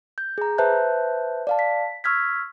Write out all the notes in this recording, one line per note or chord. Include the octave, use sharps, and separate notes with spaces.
G6
G#4 A#5
B4 C5 E5 A5 F#6 G6
D5 F5 A5
B6
C#6 E6 F6 G#6 B6